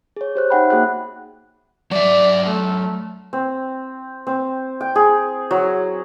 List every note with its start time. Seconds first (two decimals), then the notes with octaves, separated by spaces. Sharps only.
0.17 G#4 C#5
0.35 G4 C5 F#6
0.50 D#4 E5 F#5 G5 B5
0.70 A#3 F#4 G#4 F#6
1.91 F#3 D5 E5
2.46 A3
3.33 C4
4.27 C4
4.81 G5
4.95 G#4
5.51 F#3